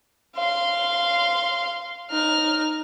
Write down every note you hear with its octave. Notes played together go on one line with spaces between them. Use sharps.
F5 C6
D#4 F6